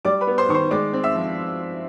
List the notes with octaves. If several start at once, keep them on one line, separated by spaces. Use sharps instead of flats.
G3 D5 D6
B4 B5
B3
C5 C6
D#3 C#6
C5 C6
G#3 D5 D6
C4
E5 E6
F3